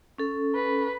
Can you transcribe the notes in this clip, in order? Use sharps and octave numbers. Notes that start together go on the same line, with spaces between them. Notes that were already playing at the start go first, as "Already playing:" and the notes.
C#4 A4
B4